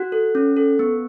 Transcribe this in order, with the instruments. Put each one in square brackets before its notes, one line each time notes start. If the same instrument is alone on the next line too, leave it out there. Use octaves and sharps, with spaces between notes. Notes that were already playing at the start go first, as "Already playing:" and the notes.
Already playing: [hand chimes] F#4 F#5 F#6
A4
C#4
A4
B3